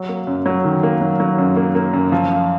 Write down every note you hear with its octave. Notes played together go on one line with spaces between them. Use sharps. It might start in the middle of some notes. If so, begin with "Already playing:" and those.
Already playing: F#3
A#3
F#2
F#3
D#3
A#3
F#3
F#3
F#2
A#3
A#3
F#2
F3
F3